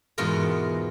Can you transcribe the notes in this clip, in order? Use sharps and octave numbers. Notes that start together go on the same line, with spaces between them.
E2 G#2 B2 F4 A#4